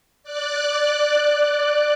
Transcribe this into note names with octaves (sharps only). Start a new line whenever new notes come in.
D5 F#6